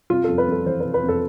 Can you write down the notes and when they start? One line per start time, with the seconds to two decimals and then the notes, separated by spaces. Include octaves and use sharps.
0.10 C3 F4
0.24 F2 A4
0.38 B4
0.48 F2 A4
0.66 E3 C5
0.80 C3 B4
0.94 B4
1.03 F2
1.09 A4